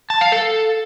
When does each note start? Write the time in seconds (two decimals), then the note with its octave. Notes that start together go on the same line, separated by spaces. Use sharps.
0.10 A5
0.21 F5
0.32 A4